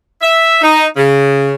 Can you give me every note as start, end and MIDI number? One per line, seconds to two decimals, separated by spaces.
0.21 0.61 76
0.61 0.86 63
0.96 1.54 49